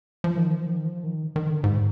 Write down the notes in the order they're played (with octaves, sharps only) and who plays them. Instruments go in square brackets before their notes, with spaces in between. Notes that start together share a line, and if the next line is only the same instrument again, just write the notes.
[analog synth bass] F3
D#3
F3
D#3
F3
D#3
D#3
D3
G#2